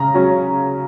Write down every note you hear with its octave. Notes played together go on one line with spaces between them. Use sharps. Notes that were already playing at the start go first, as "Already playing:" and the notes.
Already playing: C#3 A#5
F#3 C#4